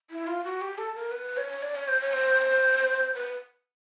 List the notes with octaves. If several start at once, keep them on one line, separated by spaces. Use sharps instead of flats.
E4
F4
F#4
G4
A4
A#4
B4
C#5
D5
C#5
C5
C#5
C5
B4